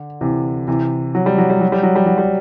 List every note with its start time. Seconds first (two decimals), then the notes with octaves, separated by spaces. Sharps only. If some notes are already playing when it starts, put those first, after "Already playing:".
Already playing: D3
0.21 C3 E3
0.68 C3 E3
1.15 F#3
1.26 G3
1.38 F#3
1.50 G3
1.61 F#3
1.72 G3
1.83 F#3
1.96 G3
2.06 F#3
2.18 G3